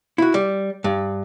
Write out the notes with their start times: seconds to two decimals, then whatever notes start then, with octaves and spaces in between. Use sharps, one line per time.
0.18 E4 F#4
0.34 G3
0.84 G2